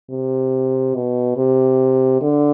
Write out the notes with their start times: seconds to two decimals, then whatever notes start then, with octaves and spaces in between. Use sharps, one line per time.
0.10 C3
0.95 B2
1.37 C3
2.21 D3